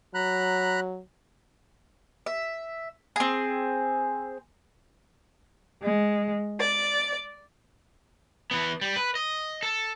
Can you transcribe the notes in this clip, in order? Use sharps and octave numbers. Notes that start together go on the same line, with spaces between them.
F#3 A#5 B5 F#6
E5
C4 G#4
G#3
D5
E3 B3
G3
B4
D#5
A4